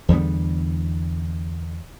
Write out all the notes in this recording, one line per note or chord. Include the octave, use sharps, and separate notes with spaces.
E2 D3 G3 B3